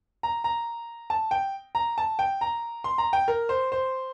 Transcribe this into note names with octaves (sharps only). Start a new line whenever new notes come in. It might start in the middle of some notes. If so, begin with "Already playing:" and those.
A#5
A#5
A5
G5
A#5
A5
G5
A#5
C6
A#5
G5
A#4
C5
C5